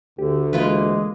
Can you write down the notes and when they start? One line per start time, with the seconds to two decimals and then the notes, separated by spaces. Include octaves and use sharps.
0.19 D2 D3 G4
0.53 E3 G#3 A#3 F4 B4